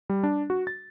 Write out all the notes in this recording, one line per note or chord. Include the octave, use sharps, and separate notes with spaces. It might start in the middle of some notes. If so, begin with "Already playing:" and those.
G3
D4
F#4
A6